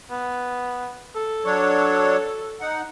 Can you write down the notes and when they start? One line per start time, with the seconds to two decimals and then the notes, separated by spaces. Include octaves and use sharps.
0.11 B3
1.16 A4
1.45 F#3 D4 C#5
2.61 D#4 F#5